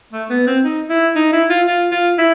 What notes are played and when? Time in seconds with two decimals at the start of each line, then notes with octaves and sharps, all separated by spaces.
0.13 A3
0.30 B3
0.47 C4
0.64 D#4
0.90 E4
1.16 D#4
1.33 E4
1.50 F4
1.67 F4
1.92 F4
2.18 E4